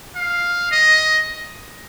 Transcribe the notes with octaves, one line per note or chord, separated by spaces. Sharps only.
F5
D#5